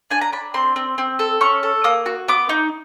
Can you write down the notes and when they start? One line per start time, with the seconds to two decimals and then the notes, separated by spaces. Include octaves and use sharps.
0.10 D4 G#5
0.21 A#5
0.33 D4 B5
0.54 C4 C6
0.76 C4
0.98 C4
1.19 A4
1.41 C#4 C#6
1.63 A4
1.84 A#3 D#6
2.06 F#4
2.28 B3 D6
2.49 D#4